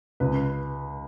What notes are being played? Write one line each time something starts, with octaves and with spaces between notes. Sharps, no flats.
C#2 B4